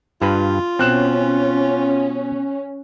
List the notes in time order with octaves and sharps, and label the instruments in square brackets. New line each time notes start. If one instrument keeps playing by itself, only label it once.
[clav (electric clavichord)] G2 B4 [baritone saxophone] F4
[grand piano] B2 F#6 E7 [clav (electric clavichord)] C4 [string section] C#4